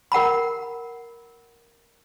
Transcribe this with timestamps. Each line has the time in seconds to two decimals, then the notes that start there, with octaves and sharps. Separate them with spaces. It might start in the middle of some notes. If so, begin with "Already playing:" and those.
0.12 A#4 F#5 A#5 B5